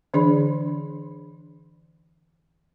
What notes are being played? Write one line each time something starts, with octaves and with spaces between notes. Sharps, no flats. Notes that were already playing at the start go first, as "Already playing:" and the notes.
D3 E3 D4 G#4 D5 B5